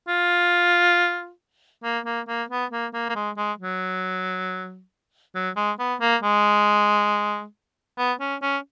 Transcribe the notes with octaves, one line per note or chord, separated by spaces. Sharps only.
F4
A#3
A#3
A#3
B3
A#3
A#3
A#3
G#3
G#3
F#3
F#3
G#3
B3
A#3
G#3
B3
C#4
C#4